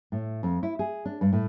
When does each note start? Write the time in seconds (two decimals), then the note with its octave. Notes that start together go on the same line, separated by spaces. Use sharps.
0.12 A2
0.43 F2
0.63 E4
0.79 G#4
1.05 D4
1.21 G2
1.33 A2